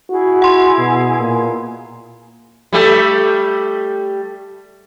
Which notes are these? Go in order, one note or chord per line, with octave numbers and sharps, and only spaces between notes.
E4 F#4 G#4
F#5 C6
B2
A#2
G3 A3 G4